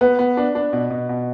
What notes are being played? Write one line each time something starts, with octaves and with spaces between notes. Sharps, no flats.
B3 B4
B3
D4
D4
B2
B2
B2